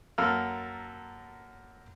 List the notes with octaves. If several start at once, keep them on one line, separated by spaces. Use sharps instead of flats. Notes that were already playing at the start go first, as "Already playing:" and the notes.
F#2 A#3 A4 F5 F6